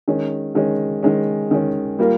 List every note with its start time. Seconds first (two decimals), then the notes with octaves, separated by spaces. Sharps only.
0.08 D#3 G#3 C#4
0.55 D#3 G#3 C#4
1.03 D#3 G#3 C#4
1.51 D#3 G#3 C#4
1.99 G3 A#3 F4 A#4